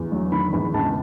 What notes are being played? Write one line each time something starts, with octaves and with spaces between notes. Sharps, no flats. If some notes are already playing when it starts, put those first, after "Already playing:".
Already playing: E2
F#3
D#3 B5
E2 B5
C#2 A5